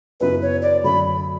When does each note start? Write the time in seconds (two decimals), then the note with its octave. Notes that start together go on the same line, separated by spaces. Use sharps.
0.20 F#2 C#3 F#3 B3 E4 B4
0.42 C#5
0.62 D5
0.84 F#2 D3 F#3 A3 B5